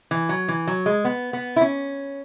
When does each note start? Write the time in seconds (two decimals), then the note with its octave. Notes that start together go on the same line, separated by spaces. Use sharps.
0.11 E3
0.29 F#3
0.48 E3
0.67 F#3
0.86 G#3
1.05 B3
1.33 B3
1.56 E4
1.61 C#4